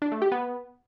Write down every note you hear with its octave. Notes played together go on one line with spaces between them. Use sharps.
D4
A3
G4
B3